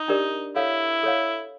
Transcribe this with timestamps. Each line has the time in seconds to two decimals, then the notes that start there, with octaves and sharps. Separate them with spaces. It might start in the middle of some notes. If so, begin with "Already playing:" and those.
Already playing: D#4
0.08 D4 G4 A#4 D5
0.56 E4 A4 C#5 F5
1.03 A4 C#5 F5